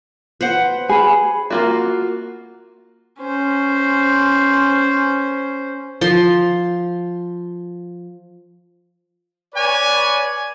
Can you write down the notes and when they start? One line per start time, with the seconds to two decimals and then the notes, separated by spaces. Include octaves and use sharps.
0.41 B4 C5 F#5
0.89 G#4 G#5 B5
1.50 A#3 F4 F#4
3.20 C#4 C5
6.01 F3 C6
9.55 B4 C#5 D5 G#5